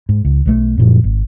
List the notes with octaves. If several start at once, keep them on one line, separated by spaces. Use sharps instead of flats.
G#2
C#2
B1 F3 A3
F#2 A#2 F3
G#1